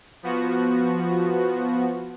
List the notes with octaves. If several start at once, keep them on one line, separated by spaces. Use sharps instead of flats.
F3 B3 F#4